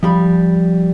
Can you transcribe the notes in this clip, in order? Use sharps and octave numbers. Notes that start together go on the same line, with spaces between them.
F3 G3 B5